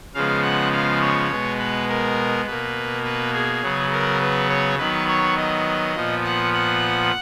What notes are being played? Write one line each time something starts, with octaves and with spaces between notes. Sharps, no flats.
C#3 F3 G#3 B3 F5
F#5
F5
C#5
B2 G#3 B3
B4
A#4
B2 A#3 B4
B4
G#4
C#3 F#3 B3
A#4
B4
C#5
D#3 F#3 B3 B4
C#5
D#5
A#2 F3 B3
F#5
F#5